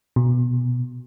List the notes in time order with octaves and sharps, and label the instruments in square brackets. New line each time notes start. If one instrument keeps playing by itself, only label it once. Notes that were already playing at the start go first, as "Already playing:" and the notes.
[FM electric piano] B2